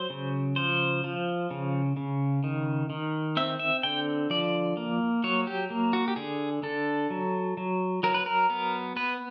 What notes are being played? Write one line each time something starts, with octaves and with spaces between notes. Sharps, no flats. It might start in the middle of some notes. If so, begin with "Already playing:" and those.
Already playing: F#3 C5
C#3
F3 C5
F3
C#3
C#3
D#3
D#3
C4 E5
E5
D3 G5
F3 D5
A#3
F#3 C#5
G4
A#3
F#4
G4
D3 G#4
D3 A4
F#3
F#3
F#3 A#4
B4
A#4
B3
B3 B4